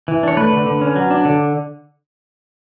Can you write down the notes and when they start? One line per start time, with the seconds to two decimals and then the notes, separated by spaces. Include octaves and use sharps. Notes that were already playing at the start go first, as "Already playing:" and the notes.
0.08 E3
0.23 D4 C#5
0.37 A3 B4
0.52 D3
0.66 D3
0.81 C#4
0.96 F#3
1.10 D4
1.25 D3